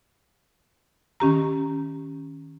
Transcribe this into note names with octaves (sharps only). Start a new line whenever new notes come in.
D#3 C#4 G4 A#5